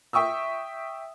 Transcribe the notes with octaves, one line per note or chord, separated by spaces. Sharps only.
E5 G5 C#6 D#6 E6